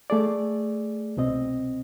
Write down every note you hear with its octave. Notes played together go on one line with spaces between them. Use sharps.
A3 G#4 D5
C2 B2 C4 D#5